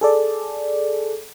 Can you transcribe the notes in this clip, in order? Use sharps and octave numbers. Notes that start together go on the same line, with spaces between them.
G#4 A4 D5